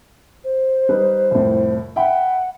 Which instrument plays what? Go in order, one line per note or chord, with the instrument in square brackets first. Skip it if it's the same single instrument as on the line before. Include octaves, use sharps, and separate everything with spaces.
[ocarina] C5
[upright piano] G3 D#4 B4
C2 F2 A2
[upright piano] E5 G5 B5 [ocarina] F#5